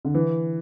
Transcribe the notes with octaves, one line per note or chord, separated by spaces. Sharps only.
D3
E3